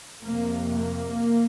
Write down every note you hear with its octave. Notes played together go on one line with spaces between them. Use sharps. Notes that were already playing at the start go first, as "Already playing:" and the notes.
F2 C3 A#3
A#3